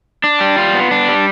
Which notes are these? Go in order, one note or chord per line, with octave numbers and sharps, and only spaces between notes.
D4
G3
F4
B3
D4
G3